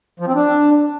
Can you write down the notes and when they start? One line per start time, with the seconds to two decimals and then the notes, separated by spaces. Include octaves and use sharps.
0.20 F3
0.27 C4
0.35 D4